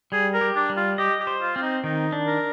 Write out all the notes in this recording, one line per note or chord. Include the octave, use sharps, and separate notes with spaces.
G3 G#4
A#4
G4
D4
G3
F4
G4 D#5
G4
C5
F4
C4 F4
D#4
D#3 D#4
D4
A#4